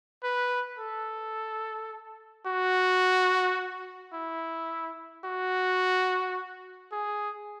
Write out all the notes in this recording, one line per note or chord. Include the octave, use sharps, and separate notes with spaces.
B4
A4
F#4
E4
F#4
G#4